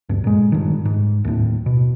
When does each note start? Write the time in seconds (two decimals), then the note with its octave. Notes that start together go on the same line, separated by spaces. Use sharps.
0.09 D2 G2
0.24 A#2 G#3
0.52 G2 D#3
0.85 G#2
1.25 D#2 A2
1.66 B2